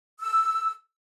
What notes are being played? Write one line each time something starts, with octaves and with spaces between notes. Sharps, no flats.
E6